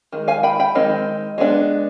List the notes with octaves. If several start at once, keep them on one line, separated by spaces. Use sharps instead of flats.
D#3 G#3
F5 G#5
G5 B5
G5 B5
D#3 G#3 C4 D#4
G#3 B3 D4